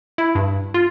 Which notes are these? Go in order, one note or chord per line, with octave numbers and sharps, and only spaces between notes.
E4
G2
F4